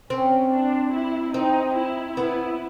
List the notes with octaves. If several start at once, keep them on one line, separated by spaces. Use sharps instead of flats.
C4 C#4
D4
E4
C4 D#4
E4
B3